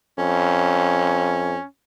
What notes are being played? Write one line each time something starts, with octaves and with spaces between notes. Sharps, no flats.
F2 C#4